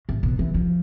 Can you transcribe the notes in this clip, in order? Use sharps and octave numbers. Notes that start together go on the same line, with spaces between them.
A2
B2
E3
F3